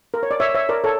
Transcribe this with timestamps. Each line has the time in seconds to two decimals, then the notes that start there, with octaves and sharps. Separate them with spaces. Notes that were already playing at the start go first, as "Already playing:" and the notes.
0.14 A#4
0.23 C#5
0.31 D5
0.40 C#5 E5
0.55 C#5 E5
0.69 A#4 D5
0.84 A4 C#5